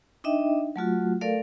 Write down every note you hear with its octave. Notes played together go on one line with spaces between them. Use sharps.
D4 D#4 D#5 E5 G5
F#3 A3 F4 F#4
A3 A4 A#4 D5 F5